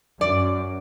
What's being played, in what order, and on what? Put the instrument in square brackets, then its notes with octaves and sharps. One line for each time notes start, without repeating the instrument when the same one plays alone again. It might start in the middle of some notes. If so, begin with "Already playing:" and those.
[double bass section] F#2 [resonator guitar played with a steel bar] D5